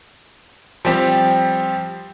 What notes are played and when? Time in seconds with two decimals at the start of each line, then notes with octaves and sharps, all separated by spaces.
0.85 F3 G3 C4 G4